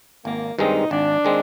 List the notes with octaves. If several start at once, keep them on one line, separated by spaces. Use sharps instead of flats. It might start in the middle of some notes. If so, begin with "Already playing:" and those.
G#1 A#3
G2 D#3 G#3 C4 D#4
G#1 D4
D#3 G#3 C4